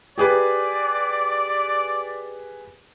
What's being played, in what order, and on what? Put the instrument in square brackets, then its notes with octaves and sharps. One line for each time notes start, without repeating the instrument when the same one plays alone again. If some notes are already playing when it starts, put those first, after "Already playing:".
[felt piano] G4 G#4 B4 [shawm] D5